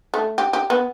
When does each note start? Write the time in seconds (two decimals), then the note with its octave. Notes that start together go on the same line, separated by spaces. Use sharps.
0.14 A3
0.38 G4
0.53 G4
0.70 B3